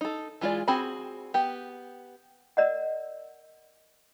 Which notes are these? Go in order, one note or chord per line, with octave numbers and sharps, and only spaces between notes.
D#4 A4
E3 G#3 F4 G#4 D5
C4 F#4 G#4 B5
B3 G4
A#4 D5 D#5 F#5